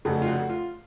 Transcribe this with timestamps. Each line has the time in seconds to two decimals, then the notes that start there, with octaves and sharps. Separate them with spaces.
0.05 F1 F2 C#3 F#4
0.22 F4
0.28 F#4
0.49 F4